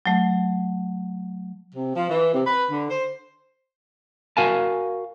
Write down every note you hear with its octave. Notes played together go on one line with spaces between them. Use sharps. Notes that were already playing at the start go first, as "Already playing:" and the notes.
F#3 A3
C3
F3
E3
C3
B4
D3
C5
F#4 A#4 F5 G#5 A5